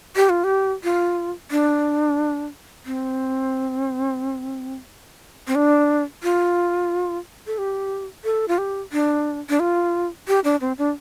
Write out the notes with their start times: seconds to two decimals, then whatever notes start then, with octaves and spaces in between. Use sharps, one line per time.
0.16 G4
0.29 F4
0.44 G4
0.84 F4
1.51 D4
2.86 C4
5.48 C4
5.55 D4
6.23 F4
7.47 A4
7.58 G4
8.24 A4
8.48 F4
8.58 G4
8.92 D4
9.50 D4
9.60 F4
10.28 G4
10.44 D4
10.61 C4
10.78 D4